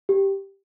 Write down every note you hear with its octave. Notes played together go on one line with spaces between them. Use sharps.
G4